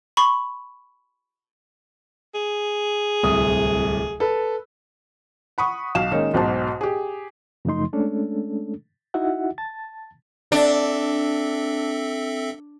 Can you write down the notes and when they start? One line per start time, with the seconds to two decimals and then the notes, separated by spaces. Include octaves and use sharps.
0.17 B5 C#6
2.35 G#4
3.23 D1 C2 D#6
4.20 A4 B4
5.58 F#5 B5 C#6 D#6
5.95 B1 F5 E7
6.12 D#3 G#3 A#3 C#4 D#4
6.34 B1 G#2 B2 C5 A5
6.81 G4 G#4
7.65 F#2 C#3 F3 A3 D#4 C6
7.93 G#3 A3 C#4 D4 A4
9.14 D#4 E4 F#4 E5 F#5
9.58 A5 A6
10.52 C4 D4 A4 E5